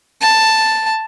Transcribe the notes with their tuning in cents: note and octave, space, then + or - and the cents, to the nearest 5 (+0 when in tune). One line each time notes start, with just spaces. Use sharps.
A5 +5